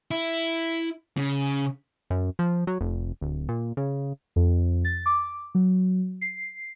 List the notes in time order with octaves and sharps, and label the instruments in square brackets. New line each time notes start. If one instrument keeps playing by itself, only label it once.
[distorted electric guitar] E4
C#3
[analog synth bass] F#2
F3
F#3
F1
D1
A#2
C#3
[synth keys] F2
A6
D6
F#3
C7